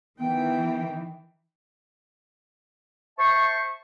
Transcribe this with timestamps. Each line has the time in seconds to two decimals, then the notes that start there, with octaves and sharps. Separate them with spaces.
0.19 D#3 E3 B3 G5
3.19 C5 E5 A5 C#6